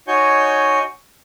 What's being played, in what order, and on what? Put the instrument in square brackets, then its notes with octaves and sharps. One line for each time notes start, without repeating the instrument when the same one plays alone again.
[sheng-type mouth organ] D#4 F#4 C#5 G#5 C#6 G6